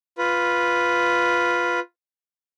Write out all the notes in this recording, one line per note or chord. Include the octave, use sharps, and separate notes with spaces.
F4 B4